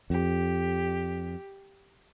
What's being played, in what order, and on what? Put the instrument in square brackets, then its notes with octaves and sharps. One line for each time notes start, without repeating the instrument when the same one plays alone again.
[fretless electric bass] F2 [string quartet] G4